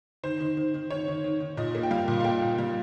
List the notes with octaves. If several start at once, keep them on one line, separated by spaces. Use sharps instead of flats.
D#3 C5
D#3
D#3
D#3
D#3 C#5
D#3
D#3
D#3
A#2 D#5
A#3
G5
G3 F5
A#2
F5
A#3 G5
A#2
G3